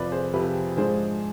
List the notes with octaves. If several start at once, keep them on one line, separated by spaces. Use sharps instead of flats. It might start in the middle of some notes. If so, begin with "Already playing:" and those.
Already playing: F2 C3 F3 B4 D5
G#4 C5
F2 C3 F3 G4 B4
G#2 F3 G#3 D4 G#4 C5